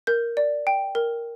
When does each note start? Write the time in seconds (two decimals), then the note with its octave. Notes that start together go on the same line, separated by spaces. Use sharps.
0.07 A#4 G6
0.37 D5
0.67 G5
0.95 A#4